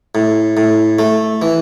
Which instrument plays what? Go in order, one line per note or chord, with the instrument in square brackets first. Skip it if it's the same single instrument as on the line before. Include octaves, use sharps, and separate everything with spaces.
[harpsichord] A2
A2
A3
E3